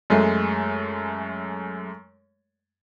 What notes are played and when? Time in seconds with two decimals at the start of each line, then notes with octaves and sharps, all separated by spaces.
0.10 F#2 G#3 A3